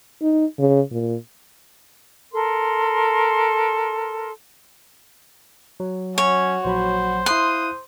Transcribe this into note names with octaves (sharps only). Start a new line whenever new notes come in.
D#4
C#3
A#2
A4 A#4 C6
F#3
C#4 F#4 C#5
A#1 F#3 C5 B5
E4 F5 C6 D#6 F#6